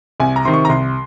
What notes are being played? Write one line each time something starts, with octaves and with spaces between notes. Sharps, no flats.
C2 G#5
A#5
C3 D#3 C6
C#6
A#5
C2 C6